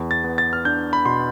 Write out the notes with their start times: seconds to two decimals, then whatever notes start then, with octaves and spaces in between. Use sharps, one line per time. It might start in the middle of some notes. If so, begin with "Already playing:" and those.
Already playing: E2
0.11 A6
0.24 B3
0.38 A6
0.53 F6
0.65 D4 G6
0.93 B5
1.06 B2 C6